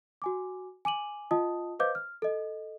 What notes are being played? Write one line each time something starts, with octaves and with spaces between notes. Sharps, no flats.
F#4 G#5 D6
G#5 D6 D#7 F#7
F4 D#5 G5 A5 D#6
B4 C5 D#5 F5 D6 G6
F6
A4 D#5